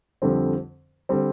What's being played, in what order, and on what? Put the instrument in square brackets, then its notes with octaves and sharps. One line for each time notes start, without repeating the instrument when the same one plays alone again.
[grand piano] F2 D3 G3 C4
D3 G3 C4